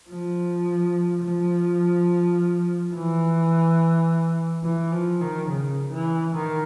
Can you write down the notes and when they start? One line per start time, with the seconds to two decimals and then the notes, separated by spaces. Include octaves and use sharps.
0.09 F3
1.23 F3
2.94 E3
4.64 E3
4.92 F3
5.21 D#3
5.49 C#3
5.91 E3
6.34 D#3